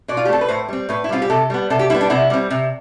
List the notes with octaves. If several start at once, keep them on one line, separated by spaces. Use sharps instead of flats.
B2 D5
F4
G4
A3 C4 A4
B4
A2 C5
G3 C4
A2 B4
E4
G3 C4 F4
G4
C3 A4
G3 B3
C3 A4
G4
G3 B3 E4
D4
C3 E4
G3 C4
C3